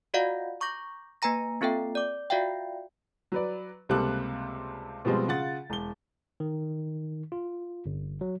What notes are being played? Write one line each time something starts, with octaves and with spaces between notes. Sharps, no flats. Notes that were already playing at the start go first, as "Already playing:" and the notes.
F4 F#4 D5 D#5 F5 F#5
A#5 C#6 D6 G6 A#6
A#3 B4 G#5 A#5 A#6
A#3 C4 F4 A4 E5 G5
D5 D6
F4 F#4 D5 E5 F5 G5
F#3 B4 D5
C#2 C3 G3 A#3 A4 F#6
B2 F3 G3 G#3 C4
C#3 F4 F#5 A6
E1 G7
D#3
F4
G1
F#3